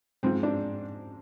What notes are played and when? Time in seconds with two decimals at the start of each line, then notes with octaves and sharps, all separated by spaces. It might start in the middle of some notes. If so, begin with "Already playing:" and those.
0.23 G#2 F3 G#3 C4
0.43 D4